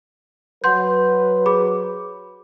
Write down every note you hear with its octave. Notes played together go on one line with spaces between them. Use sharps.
F#3 B4 F#5 C6 G6
G#4 B5 D6